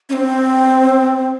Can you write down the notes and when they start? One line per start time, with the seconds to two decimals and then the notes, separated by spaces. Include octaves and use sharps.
0.09 C#4
0.13 C4